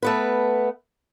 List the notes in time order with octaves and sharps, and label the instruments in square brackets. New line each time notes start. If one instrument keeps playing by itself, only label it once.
[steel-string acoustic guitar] A3 B3 B4